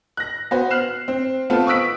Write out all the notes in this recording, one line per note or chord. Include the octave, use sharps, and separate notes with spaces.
F#6 A#6
B3 F#4 C5
F6 F#6 C7 E7
C4
A3 B3 C4 F4 A4
C#6 D#6 E6 F#6 B6 D7